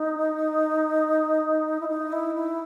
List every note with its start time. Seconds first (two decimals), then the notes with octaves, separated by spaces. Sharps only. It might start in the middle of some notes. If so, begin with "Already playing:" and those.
Already playing: D#4
1.80 E4
1.88 D#4
2.12 E4
2.35 E4